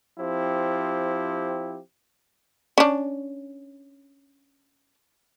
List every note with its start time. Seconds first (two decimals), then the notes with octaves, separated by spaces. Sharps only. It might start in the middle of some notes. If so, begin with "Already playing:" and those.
0.18 F3 C4 E4 G4
2.78 C#4 D4